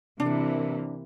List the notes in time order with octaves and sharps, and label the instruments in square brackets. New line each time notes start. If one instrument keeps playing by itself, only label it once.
[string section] C3 E3 A#3 [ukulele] D4